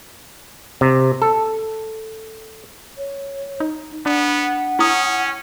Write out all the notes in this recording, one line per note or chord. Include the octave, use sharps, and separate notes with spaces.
C3
A4
C#5
D#4
B3 D4 F#5
C#4 E4 D#6